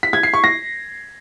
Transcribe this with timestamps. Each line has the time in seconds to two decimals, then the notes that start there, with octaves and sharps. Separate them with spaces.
0.03 B6
0.13 G#6
0.23 C7
0.34 C#6
0.44 A#6